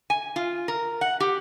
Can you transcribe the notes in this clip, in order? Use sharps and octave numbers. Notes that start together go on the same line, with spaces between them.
G#5
F4
A#4
F#5
G4